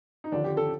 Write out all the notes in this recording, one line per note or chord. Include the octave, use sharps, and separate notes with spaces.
D#4
D#2 D3 F3 D4
G4
A4